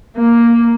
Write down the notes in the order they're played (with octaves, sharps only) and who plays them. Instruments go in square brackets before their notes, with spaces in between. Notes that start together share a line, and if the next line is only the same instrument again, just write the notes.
[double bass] A#3